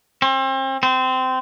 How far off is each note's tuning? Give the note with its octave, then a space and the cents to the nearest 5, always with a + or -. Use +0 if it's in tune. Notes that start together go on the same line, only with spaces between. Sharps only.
C4 +35
C4 -20